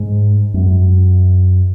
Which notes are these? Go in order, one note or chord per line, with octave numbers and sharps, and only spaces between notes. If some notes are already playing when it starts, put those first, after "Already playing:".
Already playing: G#2
F#2